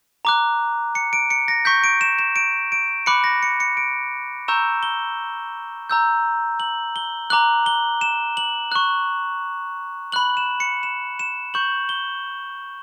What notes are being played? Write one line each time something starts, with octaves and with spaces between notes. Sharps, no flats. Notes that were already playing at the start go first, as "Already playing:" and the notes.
A#5 D6 F#6
C#7
D7
C#7
A#6
C#6 G6 B6
D7
E7
E7
D7
D7
B5 D6 F#6 C#7
A#6
C#7
C#7
D7
A#5 C#6 E6 G6 E7
G7
A#5 E6 G6
F#7
G7
A#5 D6 F#6 F#7
G7
E7
F#7
C#6 F#6
B5 F#6 F#7
E7
C#7
E7
E7
C#6 G6 F#7
G7